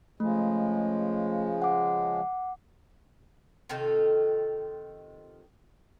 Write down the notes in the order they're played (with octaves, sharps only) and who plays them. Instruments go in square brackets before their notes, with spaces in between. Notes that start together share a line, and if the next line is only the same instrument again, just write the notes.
[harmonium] C#3 F3 G#3 [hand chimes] A3
[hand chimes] F#5 D6
[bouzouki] C3 D#3 F4 A4